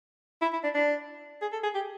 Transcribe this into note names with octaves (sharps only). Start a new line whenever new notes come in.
E4
E4
D4
D4
G#4
A4
G#4
G4